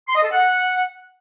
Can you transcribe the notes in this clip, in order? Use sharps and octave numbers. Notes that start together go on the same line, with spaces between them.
C6
D#5
A4
F#5